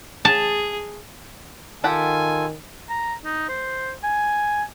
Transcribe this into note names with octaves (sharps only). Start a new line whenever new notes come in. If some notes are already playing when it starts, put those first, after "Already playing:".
G#4 A5
D#3 F4 G4 A4 F#5 G#5 A5
A#5
D#4
C5
G#5